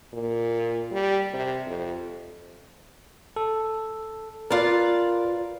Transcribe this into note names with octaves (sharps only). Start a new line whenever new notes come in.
A#2
G3
C3
F2
A4
F4 A#4 B4 D5 F5